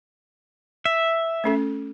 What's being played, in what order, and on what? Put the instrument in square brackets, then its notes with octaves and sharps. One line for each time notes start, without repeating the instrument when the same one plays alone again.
[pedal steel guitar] E5
[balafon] A3 C#4 A4